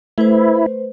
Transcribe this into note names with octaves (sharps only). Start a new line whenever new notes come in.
A3 E4 B4 C5